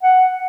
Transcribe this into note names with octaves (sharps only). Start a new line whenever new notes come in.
F#5